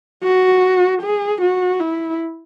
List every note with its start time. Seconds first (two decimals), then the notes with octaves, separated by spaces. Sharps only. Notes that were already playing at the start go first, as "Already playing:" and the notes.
0.24 F#4
1.02 G#4
1.41 F#4
1.80 E4